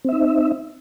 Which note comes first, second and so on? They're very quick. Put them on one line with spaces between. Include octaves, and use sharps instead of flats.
C4 E5 D#4